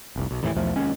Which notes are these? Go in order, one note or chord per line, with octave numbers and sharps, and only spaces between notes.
F1 C2
B1
D#2 A2 C3 E3
B1 E2 F3 A3
F1 D#2 G#3 C#4